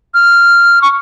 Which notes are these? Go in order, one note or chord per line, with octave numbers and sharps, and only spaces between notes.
F6
C#6